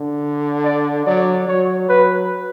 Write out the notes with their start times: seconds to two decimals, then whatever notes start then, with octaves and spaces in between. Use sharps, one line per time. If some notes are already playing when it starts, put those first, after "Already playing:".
Already playing: D3
0.65 D5
1.06 F#3 D5
1.48 F#3 C#5
1.89 F#3 B4